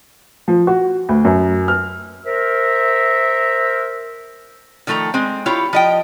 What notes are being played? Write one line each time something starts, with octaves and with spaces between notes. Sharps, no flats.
F3
F#4
D2
F#2
F6
A#4 C5 E5
D#3 F3 A3 A4 A#5
G#3 C4
E4 F4 G4 C#5
F3 D#5 G5